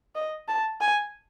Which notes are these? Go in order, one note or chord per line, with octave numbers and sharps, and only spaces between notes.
D#5
A5
G#5